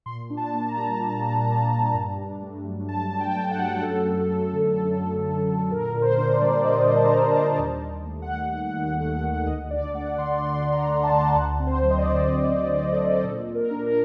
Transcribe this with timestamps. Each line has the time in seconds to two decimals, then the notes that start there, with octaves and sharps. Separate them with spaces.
0.06 A#2 C6
0.30 D4
0.37 A5
0.54 A#3
0.69 A#5
0.77 G3
1.00 A#2
1.24 D4
1.48 A#3
1.70 G3
1.94 G2
2.18 D4
2.42 A3
2.65 F#3
2.88 G2 A5
3.11 D4
3.20 G5
3.36 A3
3.51 F#5
3.59 F#3
3.82 F#2 A4
4.06 F#2
4.30 A3
4.53 D3
4.77 F#2
5.00 F#2
5.24 A3
5.47 D3
5.71 A#2 A#4
5.94 A#2
6.02 C5
6.18 D4
6.33 D5
6.41 G3
6.58 D5
6.64 A#2 D#5
6.88 A#2
6.96 A5
7.05 A#5
7.12 D4 A5
7.28 A5
7.35 G3
7.50 A#4
7.59 D#2 C5
7.82 D#2
8.06 A3
8.22 F#5
8.29 D#3
8.53 D#2
8.76 D#2
9.00 A3
9.23 D#3
9.47 D2 D#5
9.71 D4 D5
9.94 A3 F#5
10.18 D3 C6
10.41 D2 C6
10.65 D4
10.73 A#5
10.88 A3
11.04 A5
11.12 D3
11.36 D2 F#5
11.60 C4
11.67 C5
11.83 F#3
11.90 D#5
11.98 D5
12.06 D3
12.29 D2 C5
12.53 C4
12.77 F#3
12.92 A4
13.00 D3
13.23 A#2 A4
13.48 A#2
13.55 A#4
13.71 D4
13.86 A#4